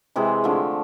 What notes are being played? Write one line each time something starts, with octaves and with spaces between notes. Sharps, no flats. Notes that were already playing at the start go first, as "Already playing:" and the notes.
C3 E3 G#3 G#4
D3 F3 A3